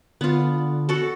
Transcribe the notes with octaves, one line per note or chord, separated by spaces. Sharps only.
D3 B3 F4
F#4 A4